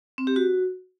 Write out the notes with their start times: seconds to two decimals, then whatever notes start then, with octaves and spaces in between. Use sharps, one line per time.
0.18 C4
0.27 G4
0.36 F#4